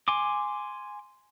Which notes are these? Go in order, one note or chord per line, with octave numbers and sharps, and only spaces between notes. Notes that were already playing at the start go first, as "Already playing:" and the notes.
G#5 C6 D6